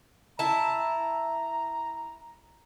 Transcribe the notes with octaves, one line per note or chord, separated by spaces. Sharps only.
E4 A5 A#5